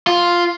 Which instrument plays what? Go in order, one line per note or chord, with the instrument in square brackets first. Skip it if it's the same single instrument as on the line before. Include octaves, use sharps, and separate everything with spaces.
[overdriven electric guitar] F4